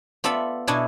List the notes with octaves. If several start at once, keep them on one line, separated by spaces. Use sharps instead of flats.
B3 F4 A4 D5 E5 B5
B2 D4 E4 A4 G#5